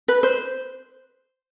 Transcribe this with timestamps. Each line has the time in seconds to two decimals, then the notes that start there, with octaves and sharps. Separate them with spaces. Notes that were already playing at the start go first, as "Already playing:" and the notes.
0.08 B4
0.23 C5